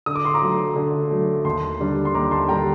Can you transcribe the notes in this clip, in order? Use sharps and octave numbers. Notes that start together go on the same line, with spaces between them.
D3 D#6
D6
C6
A#5 D6
F#3 A3
D3
F#3 A3
D#2 A5 C6
D3 G3 D4
C6
D#2 A#5 D6
A5 C6
D3 G3 D4 G5 A#5